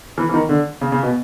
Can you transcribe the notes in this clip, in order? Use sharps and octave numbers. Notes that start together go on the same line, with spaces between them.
E3
E3
D#3
D3
C#3
C#3
B2